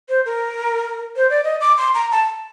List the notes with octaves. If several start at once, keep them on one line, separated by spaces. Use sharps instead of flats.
C5
A#4
C5
D5
D#5
D6
C6
A#5
A5